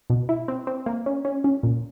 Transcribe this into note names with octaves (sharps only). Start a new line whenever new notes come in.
B2
E4
C4
C4
A#3
C#4
C#4
C#4
A#2